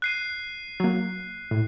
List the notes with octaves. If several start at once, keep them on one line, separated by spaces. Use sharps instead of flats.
F#6 C7 D#7
F#3 A#3
A2